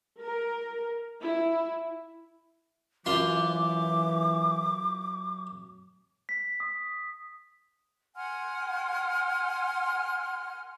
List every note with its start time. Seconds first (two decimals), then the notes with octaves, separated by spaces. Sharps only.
0.21 A#4
1.22 E4
3.06 F#2 E3 F4 C6 D6
6.29 B6
6.60 D#6
8.15 F#5 G#5 C6 F6